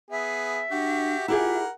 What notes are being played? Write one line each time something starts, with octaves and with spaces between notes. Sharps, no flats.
B3 G#4 E5
D4 F#4 G4
E4 F4 G4 G#4 A#4 F#5